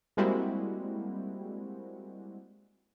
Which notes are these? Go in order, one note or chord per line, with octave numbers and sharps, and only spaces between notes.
G3 G#3 A#3 C4 E4 F#4